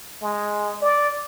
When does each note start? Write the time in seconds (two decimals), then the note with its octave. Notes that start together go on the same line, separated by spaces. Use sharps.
0.22 G#3
0.82 D5